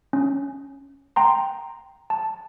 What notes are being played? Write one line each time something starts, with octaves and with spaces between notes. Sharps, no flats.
C#4
G5 A#5 C6
A5